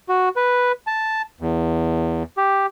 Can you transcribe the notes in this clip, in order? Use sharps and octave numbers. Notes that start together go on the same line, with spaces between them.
F#4
B4
A5
E2
G4